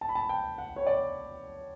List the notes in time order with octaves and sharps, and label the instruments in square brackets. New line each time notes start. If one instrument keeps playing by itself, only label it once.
[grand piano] A5
B5
A5
G5
F#5
C#5
D5